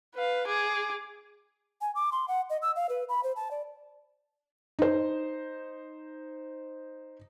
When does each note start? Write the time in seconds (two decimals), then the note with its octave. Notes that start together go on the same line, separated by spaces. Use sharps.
0.15 B4 F5
0.47 G#4 D6
1.81 G#5
1.95 D6
2.12 C6
2.28 F#5
2.50 D#5
2.62 E6
2.76 F5
2.89 B4
3.09 B5
3.23 C5
3.36 A5
3.51 D5
4.79 D#4 C5